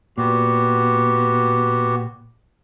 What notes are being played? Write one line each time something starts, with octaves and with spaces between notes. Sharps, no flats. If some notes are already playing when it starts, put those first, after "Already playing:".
A#2 B3 F#4 G4